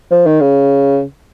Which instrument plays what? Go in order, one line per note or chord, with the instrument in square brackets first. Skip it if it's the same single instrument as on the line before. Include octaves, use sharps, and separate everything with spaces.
[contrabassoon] F3
D#3
C#3